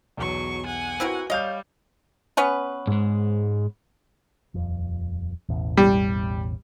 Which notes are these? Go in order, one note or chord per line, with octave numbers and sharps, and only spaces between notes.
B1 E2 F#3 C#6
F#5 G#5
C4 E4 F#4 A#4 B4
G3 C#5 D#5 F5 G6
B3 C#4 B4
G#2 G#3
D#1 F2
A1 E2 B2
G3